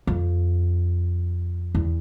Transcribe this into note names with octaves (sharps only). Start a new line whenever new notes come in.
F2
E2